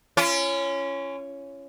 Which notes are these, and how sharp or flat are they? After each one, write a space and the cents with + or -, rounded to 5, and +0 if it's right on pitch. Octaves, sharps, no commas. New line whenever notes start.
C#4 +0 F4 -45